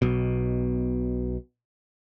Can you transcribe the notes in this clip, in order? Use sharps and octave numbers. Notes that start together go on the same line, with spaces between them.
B1 B2